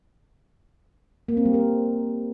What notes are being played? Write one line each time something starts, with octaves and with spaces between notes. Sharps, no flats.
A#3
C4
G3
A#4